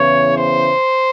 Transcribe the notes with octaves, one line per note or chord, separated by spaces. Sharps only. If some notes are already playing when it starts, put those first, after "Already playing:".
Already playing: E2 C#3 E3 C#5
C5